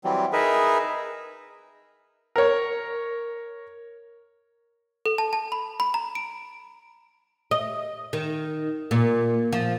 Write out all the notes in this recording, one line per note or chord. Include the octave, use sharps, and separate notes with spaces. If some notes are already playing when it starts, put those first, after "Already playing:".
E3 F#3 G3 C4
D#4 G#4 A#4 B4 E5
A#4 C#5
A4
A5
A5
B5
B5
A#5
D7
D#5
D#3
A#2
F3